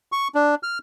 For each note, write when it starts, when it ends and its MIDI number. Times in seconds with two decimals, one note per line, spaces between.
0.12 0.28 85
0.35 0.55 62
0.63 0.78 89